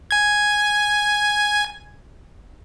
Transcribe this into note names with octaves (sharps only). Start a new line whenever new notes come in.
G#5 G#6